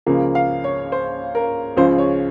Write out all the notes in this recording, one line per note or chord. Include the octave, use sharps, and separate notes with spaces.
C#2 C#3 F3 A#3
F5
C#5
C5
A#4
C#2 C#3 F3 C5
C#5